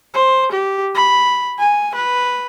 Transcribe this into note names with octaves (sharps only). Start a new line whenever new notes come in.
C5
G4
B5
G#5
B4